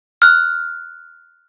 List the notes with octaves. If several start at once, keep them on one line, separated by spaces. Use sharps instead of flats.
F6 F#6